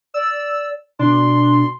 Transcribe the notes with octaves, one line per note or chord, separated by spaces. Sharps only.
D5 E6
B2 D4 C6